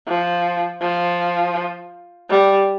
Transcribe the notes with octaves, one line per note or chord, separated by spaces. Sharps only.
F3
F3
G3